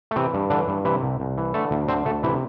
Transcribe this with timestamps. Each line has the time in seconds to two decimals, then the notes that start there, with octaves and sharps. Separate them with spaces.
0.11 A3
0.16 C3 E3 C4
0.34 G2
0.50 D3 E3 D4
0.68 G2
0.85 C3 E3 E4
1.03 C2
1.20 C2
1.38 E3
1.54 D3 A3 A4
1.71 D2
1.88 D3 C4 C5
2.05 D2 A3 A4
2.23 C3 E3 E4